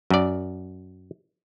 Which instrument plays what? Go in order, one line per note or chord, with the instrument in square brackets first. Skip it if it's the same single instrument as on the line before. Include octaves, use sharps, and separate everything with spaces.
[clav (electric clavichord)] F#2 D5